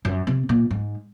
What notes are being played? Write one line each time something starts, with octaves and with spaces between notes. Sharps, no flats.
F#2
C3
A#2
G#2